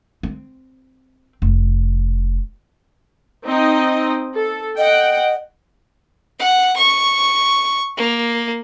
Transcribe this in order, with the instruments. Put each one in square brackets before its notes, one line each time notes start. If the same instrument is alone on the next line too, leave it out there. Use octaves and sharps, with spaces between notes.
[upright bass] C4
F1
[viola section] C4 D#4 D#5
A4
[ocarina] D#5 [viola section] F#5 G5
[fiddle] F#5
C#6
A#3